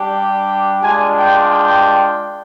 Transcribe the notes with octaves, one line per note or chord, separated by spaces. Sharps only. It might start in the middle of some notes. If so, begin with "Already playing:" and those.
Already playing: G3 D4 G4
G#3 D4 F4 G#5
G5
G5